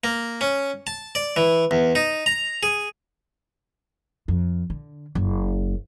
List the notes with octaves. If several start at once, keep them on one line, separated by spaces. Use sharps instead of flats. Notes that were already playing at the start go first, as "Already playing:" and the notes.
A#3
C#4
A5
D5
E3
E2
D#4
A#5
G#4
F2
D3
F#1